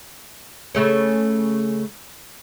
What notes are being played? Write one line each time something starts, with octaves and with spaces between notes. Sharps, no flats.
C#3 A3 C#4